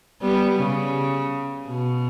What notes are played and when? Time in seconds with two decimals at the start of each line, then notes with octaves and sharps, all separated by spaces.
0.21 G3 B3
0.58 C#3
1.67 B2